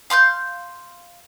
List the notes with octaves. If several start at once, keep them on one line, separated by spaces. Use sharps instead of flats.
F5 C6 E6 G6